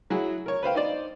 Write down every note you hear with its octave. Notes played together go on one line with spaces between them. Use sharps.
F#3 E4 F#4 G#4
A#4 C#5
B4 C5 F5 G5
D#4 C5 D5